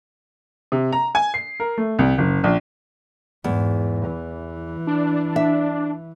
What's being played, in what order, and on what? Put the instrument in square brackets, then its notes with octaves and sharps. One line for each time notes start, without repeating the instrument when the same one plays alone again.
[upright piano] C3
A#5
G#5
C7
A#4
A3
C2
F#1
A#1
[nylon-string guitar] E2 [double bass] G#2
[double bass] E3
[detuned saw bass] D4
[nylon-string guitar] E5